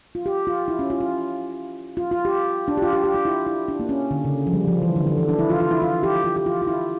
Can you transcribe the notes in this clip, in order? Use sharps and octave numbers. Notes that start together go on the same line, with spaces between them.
F4
G4
F4
E4
C#4
F4
F4
F4
F4
G4
D4
G4
F4
G4
G4
F4
E4
E4
D4
A#3
C#4
D3
C#3
F3
G3
F3
E3
D3
D3
E3
D4
E4
F4
F4
E4
F4
G4
F4
G4
F4
F4
E4